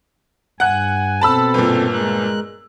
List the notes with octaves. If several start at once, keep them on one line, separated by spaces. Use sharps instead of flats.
G2 F#5 G#5 F#6
B2 C4 A4 A5 B5 E6
G1 A#2
G#3 A#4 F#6